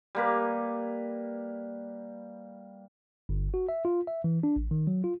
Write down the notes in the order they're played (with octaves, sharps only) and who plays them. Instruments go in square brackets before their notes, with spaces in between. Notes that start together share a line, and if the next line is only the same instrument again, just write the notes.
[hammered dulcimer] G3 A#3 B4
[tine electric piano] G1
F#4
E5
F4
E5
E3
D4
A1
D#3
F#3
F4